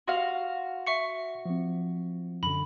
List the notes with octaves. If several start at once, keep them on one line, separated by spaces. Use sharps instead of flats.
F#4 F5 C6
E5 C#6 C#7
F3 C4
F#2 D3 B5